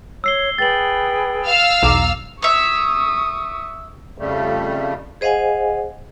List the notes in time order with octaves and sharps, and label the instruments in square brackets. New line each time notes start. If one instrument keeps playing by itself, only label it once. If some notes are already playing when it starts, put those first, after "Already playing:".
[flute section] C#5 [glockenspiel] E6 C7 G7
[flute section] G#4 B4 G5 [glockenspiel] A6 F#7
[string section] F5 E6 F6
[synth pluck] B1 E2 D6 [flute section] A#5
[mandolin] C#5 E5 [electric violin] C#6 D#6
[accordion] F2 C#3 G3 A3
[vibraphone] G#4 C5 D#5 F5 F#5 G#5